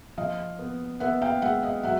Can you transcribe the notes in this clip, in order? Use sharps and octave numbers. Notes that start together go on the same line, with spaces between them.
F3 D#5 F5
B3
B3 E5 F#5
F5 G5
G#3 E5 F#5
D#5 F5
F#3 E5 F#5